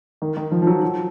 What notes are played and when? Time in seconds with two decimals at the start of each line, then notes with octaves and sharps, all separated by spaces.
0.22 D#3
0.37 D#3
0.51 F3
0.62 F3
0.67 F#3
0.82 F#3